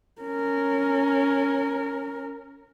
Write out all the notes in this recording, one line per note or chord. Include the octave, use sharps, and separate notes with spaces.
C#4 A#4